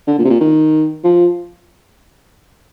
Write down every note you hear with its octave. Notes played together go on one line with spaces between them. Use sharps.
D3
A#2
C3
A#2
D#3
F3